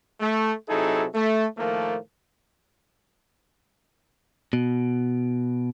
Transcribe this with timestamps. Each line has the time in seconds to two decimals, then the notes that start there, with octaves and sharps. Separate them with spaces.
0.20 A3
0.69 C3 F#3 D#4 E4 G#4 A4
1.15 A3
1.58 A2 D#3 F3 A3 A#3
4.53 B2